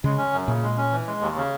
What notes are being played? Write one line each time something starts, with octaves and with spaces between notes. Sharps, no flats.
C#3 G#3
C#4
F#2
A#2 C#3
G#3
C#4
E3
G#3
D#2
C#3